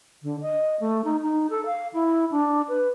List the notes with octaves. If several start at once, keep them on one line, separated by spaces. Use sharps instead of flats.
D3
D#5
A3
D#4
D#4
A4
F5
E4
D4
B4